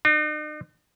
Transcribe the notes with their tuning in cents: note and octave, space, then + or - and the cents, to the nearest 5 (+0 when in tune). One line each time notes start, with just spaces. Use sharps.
D#4 -45